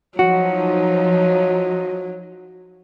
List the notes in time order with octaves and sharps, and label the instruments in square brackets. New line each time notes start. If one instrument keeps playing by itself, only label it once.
[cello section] F3 D#4 [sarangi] F#3 [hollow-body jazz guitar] F#4